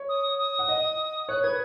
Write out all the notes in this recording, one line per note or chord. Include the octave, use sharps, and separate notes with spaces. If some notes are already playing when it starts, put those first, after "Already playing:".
Already playing: C#5
D#6
D#6
F#5
D#5
C#5 F#6
B4 G#6